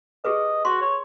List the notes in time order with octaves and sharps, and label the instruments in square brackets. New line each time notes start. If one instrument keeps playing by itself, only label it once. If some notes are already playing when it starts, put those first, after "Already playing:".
[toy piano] G4 G#4 B4 [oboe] D#5
[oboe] F#4 [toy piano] C6
[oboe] C#5